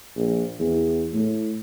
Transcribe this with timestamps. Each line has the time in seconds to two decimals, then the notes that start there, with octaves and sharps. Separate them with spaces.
0.16 A#1
0.59 E2
1.13 A2